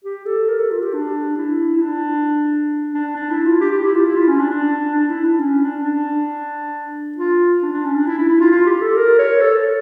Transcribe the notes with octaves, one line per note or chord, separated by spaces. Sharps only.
G4
A4
A#4
A4
F4
G4
D4
E4
E4
D4
D4
D4
E4
F4
G4
G4
E4
F4
E4
F4
C#4
D4
D4
D4
E4
D4
C#4
D4
D4
F4
D4
D4
C#4
D4
E4
E4
E4
F4
F4
G4
A4
A#4
C#5
A4